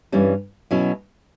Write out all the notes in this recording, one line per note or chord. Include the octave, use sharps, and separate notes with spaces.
G2 E3 G3 C#4
B2 F#3 C#4 E4